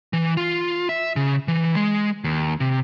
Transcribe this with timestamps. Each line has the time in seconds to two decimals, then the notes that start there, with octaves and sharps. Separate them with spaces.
0.13 E3
0.37 F4
0.89 E5
1.16 C#3
1.48 E3
1.75 G#3
2.24 D#2
2.60 C3